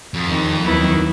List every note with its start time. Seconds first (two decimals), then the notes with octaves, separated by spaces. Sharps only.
0.14 F2
0.26 E2 C3 D#3
0.61 D#2 D#3 F#3 B3 E4